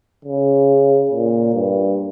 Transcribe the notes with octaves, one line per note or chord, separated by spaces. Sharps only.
C#3
A#2
G2